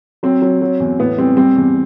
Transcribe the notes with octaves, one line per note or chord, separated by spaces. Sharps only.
F#3 C4
F#3
F#3
E2
A2 B3
G3 C4
G3 C4
E2